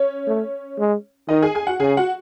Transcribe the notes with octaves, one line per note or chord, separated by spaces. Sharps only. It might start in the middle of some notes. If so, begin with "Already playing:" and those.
Already playing: C#4 C#5
A3
G#3
D#3 D#4 D#5
G#4 G#5
G#4 G#5
F#4 F#5
C#3 G#4 G#5
F#4 F#5